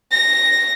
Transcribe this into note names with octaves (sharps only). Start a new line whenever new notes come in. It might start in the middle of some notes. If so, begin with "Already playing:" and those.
A#6